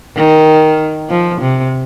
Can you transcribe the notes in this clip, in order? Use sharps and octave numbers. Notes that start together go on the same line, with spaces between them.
D#3
F3
C3